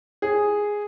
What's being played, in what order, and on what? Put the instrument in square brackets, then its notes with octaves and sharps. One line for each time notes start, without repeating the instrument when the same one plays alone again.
[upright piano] G#4